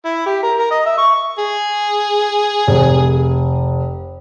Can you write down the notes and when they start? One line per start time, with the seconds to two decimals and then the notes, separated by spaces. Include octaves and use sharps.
0.05 E4
0.26 G4
0.43 A#4
0.59 A#4
0.71 D#5
0.86 E5
0.98 C#6
1.38 G#4
2.67 F1